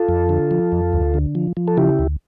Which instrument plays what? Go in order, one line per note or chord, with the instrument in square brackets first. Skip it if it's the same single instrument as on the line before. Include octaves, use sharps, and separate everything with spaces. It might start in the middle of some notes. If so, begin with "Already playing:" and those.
Already playing: [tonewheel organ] F4 A4
F2
D3
F3
F2
D2
D3
F3
F3
A4
C#3 E4 G4
D2